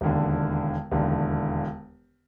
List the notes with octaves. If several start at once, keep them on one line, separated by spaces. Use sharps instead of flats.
E1 D#2 D3
E1 D#2 D3